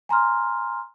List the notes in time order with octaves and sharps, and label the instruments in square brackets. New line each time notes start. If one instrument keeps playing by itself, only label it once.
[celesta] G#5 A#5 C6 F6